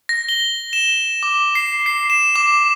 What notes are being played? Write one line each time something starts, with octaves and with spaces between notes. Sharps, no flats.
A#6
G7
E7
D6
C7
C7
E7
D6